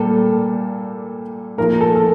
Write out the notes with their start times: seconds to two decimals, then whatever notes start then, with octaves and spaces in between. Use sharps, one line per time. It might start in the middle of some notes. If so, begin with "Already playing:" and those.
Already playing: A#2 G3 A#3 A4
1.58 A#2 F3 A#3 A#4
1.81 A4
1.96 A4